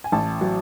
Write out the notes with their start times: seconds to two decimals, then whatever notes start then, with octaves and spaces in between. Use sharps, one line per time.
0.04 G#5
0.12 A1 A5
0.41 F#3